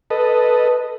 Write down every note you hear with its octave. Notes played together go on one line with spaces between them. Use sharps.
A4 B4 D#5